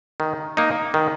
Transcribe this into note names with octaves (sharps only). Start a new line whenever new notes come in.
D#3
A#3 D#4
D#3